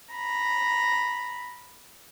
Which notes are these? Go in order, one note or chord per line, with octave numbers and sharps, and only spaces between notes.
A#5 B5